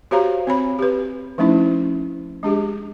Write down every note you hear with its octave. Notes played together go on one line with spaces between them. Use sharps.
F#4 G4 C5 C#5 F5 A#5
C4 C#5 B5
G4 B4
F3 A3 C#4 D#4 E4
G#3 D4 G4 G#4